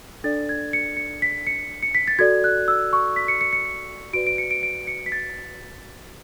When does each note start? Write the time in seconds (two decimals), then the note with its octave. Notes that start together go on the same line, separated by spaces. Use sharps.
0.24 D4 A4 D5 A6
0.49 G#6
0.73 C#7
0.97 C#7
1.22 B6
1.47 C#7
1.83 C#7
1.95 B6
2.08 A6
2.19 F#4 A4 D5 G#6
2.44 F#6
2.68 E6
2.93 C#6
3.16 B6
3.28 C#7
3.41 C#7
3.53 C#7
3.65 C#7
4.13 F#4 B4 D5 D7
4.27 D7
4.38 C#7
4.51 D7
4.63 D7
4.87 C#7
5.06 B6
5.12 A6